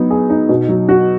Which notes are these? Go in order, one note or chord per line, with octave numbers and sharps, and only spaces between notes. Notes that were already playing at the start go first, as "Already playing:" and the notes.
Already playing: F#3 B3 D#4
G#4
D#4
B2
F#3
F#4